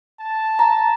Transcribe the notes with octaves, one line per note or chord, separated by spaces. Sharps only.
A5
A#5